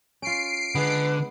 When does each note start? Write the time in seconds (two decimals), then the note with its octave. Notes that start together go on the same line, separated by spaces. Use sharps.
0.22 C#4 F4 C7 D7
0.75 D3 G#3 B3 B4